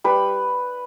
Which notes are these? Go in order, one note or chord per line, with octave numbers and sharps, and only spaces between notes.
G3 B4